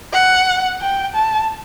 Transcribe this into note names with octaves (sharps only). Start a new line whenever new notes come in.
F#5
G5
A5